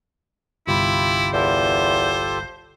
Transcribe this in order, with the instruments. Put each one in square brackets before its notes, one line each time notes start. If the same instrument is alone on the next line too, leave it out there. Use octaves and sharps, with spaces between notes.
[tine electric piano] G1 C2 B5 [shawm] E4 [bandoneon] F4 G4
[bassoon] E2 [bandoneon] F4 G4 A4 [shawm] C5